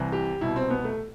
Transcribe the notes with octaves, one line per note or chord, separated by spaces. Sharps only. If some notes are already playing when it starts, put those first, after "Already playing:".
Already playing: C2 C3 E3
G4
C2 B2 E4
C4
B3
A3